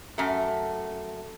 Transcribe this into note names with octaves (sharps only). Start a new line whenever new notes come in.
F#2 A3